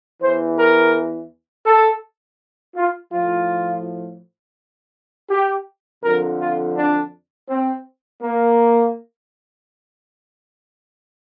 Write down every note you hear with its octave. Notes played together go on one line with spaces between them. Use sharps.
E2 E3 C5
A#4
A4
F4
A2 F3 F4
G4
F2 D3 F3 A#4
F4
D4
C4
A#3